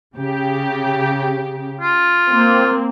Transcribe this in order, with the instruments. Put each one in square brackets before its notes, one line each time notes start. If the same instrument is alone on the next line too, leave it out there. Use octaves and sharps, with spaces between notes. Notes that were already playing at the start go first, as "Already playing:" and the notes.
[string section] C#3 G4
[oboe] F4
[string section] A#3 C4